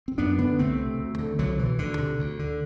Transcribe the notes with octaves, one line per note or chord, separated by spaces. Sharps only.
C4
F#2 B3 D4
D3 B3 D4
C2 A3 C4
C3
D2
D3
C2 D3 F#3
B2 E3
D2 D3
C3
D2
D3